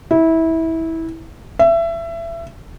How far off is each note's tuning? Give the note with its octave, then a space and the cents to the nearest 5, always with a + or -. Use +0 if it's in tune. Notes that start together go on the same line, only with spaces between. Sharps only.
E4 -20
E5 +25